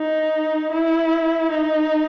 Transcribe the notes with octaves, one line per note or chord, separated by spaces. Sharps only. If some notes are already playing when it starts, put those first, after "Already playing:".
Already playing: D#4
E4
D#4